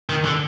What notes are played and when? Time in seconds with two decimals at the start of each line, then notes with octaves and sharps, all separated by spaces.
0.10 D#3
0.25 D3